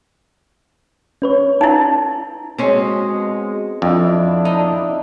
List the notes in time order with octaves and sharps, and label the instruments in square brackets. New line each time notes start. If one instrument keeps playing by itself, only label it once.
[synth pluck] C#4 B4 C#5
[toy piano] D#4 E4
[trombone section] B2 G#3 [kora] C4 C#4
[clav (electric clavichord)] F2 [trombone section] D4 E4
[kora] D#4